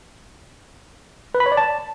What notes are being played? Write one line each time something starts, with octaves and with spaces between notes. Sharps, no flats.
B4
B5
C#5
D5
A5